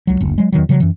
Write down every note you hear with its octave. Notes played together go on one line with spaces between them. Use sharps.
C#2 F#3
F#1 D2
F#3 G#3
E2 D#3 F#3
C#3 F3 F#3
F#2 E3